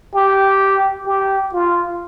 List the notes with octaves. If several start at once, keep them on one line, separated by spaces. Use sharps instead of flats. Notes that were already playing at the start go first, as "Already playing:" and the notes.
G4
G4
F4